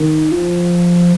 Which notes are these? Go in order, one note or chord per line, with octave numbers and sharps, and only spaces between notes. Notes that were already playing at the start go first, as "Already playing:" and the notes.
Already playing: D#3
F3